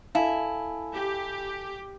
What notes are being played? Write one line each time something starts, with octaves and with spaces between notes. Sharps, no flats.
E4 A4 F5 G#5 A5
G4